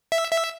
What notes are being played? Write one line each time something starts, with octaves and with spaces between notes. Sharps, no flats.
E5
E5